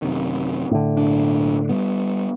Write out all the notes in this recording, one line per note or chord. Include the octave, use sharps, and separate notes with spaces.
F#2 C3 D#3
A2 D3
B1 D4
G3 B3